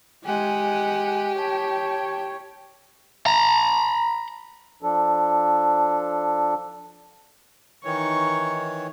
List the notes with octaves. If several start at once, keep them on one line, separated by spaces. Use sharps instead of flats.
G#3 G4 F#5 G#5
C#5 G5 A5
A#5 B5
F3 D4 A4
D#3 E3 D#4 C#5 C#6